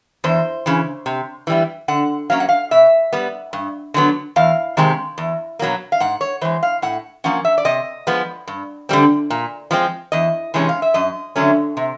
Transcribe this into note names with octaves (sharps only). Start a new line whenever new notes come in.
E2 C5
C#3 E3
C3
E3 G3 B3
D3 F#5
F#3 A#3 C#4 F5
F#5
F5
B2 E5
G3 B3
G2
D3 F#3 B3
E2 F5
C3 D#3 G#3 C4
E2
B2 F#3 A#3
F5
G#2 F#5
C#5
E3 G#3 C5
F5
A2 F#5
F3 A#3 C#4 F#5
E5
D5
C3 D#5
F3 G#3 B3
G2
D3 G3 C4
A#2
F3 G#3 C4
E2 D#5
C3 E3 G#3 C#4
F5
E5
F#2 D#5
D3 F#3 A3 C#4
C3